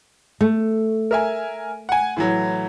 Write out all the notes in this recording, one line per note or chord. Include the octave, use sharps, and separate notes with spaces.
A3
A#4 E5 G#5
F#5 G#5
A2 E3 F#3